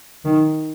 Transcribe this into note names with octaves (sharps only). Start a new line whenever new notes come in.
D#3